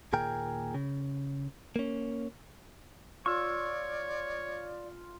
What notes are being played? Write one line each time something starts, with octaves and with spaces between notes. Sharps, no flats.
D#2 A#2 G#4 A#4 G5
C#3
A#3 C#4
F4 C#5 D5 C#6 E6